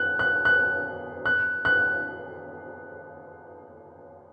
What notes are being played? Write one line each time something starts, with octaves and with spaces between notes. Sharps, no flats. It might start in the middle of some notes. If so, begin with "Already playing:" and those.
Already playing: F#6
F#6
F#6
F#6
F#6